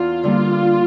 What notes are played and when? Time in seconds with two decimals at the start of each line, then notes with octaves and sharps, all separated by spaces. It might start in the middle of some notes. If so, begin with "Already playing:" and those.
Already playing: E2 F4
0.24 D3 G3 A#3